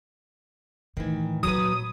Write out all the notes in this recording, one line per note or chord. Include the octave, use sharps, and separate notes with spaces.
A2 D#3 E3
A#1 A#2 F#3 B4 D#6